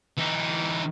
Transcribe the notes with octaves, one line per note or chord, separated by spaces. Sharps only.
E3 D#4